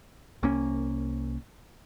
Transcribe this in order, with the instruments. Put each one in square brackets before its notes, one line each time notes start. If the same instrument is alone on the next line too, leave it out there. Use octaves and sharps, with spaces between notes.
[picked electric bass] C2 A#3 C#4